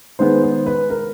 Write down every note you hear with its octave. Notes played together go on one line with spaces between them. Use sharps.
D#3 G#3 B3 C5
C5
B4
A#4